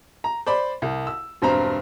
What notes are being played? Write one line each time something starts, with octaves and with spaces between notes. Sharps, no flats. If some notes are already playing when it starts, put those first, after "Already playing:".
A#5
C5 D5 B5 C6
C2
E6
E1 G2 C4 C5 A#5